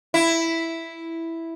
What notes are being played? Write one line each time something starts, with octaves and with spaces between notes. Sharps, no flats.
E4